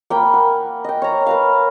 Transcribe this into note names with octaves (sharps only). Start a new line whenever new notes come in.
A#3 G5 G#5 B5
F#5
D#5 G5
C#5 A#5
A#4 B4 F5